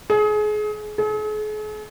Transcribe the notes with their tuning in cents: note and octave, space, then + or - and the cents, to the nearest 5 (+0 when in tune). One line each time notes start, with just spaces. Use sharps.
G#4 +30
G#4 +45